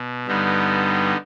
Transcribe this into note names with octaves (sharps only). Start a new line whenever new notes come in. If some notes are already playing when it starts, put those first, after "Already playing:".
Already playing: B2
G2 D3 G3 B3 D#4